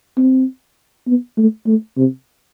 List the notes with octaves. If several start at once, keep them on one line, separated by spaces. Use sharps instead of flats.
C4
B3
A3
A3
C3